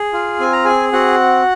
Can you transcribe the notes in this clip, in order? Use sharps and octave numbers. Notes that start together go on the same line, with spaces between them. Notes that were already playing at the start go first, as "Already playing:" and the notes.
Already playing: G#4
F4
C4 G#5
A#5
G#4 G#5
C4 F#4 F#5